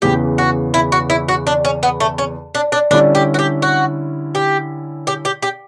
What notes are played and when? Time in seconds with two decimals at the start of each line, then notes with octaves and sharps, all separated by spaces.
0.02 E2 C#3 E3 G4
0.38 F#4
0.74 E4
0.92 F#4
1.10 E4
1.29 F#4
1.47 D4
1.65 C#4
1.83 B3
2.00 A3
2.18 C#4
2.55 D4
2.72 D4
2.90 D3 G3 C#4 D4 E4
3.15 G4
3.34 F#4
3.39 G4
3.62 F#4
4.35 G4
5.07 G4
5.25 G4
5.42 G4